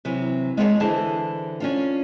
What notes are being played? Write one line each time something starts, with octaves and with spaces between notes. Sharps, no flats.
C3 E3 F#3
G#3 B3 D4 G#4 A#4 C#5
D3 E3 G#4 C5 A5
C#4 D4 F4